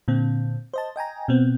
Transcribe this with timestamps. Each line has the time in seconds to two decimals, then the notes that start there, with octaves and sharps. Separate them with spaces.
0.08 A#2 D3 C4
0.74 C5 D#5 A5
0.96 D#5 G5 G#5 A#5
1.28 B2 B3 C4